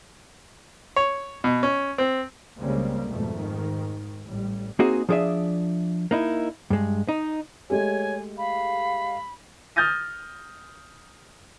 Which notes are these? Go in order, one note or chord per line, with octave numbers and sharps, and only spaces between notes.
C#5
B2
C#4
C4
C#2 C#3 G3 G#3 A#3 C4
F2 G#2 B2 A3
G#2 D#3
A1 A2 G3
A#3 C4 D#4 F#4 G#4
F3 D4 G#4 D5 E5
A#3 D#4 E4
G2 G#3
D#4
G#3 A3 G4 C#5 G#5
F5 B5
D#6 F6 G6 A6 A#6 D#7